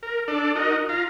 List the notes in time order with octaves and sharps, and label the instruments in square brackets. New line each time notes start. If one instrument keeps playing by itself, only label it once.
[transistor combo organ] A#4
D4 A4 D5
D#4 F#4 A#4 D#5
F4 F5 A#5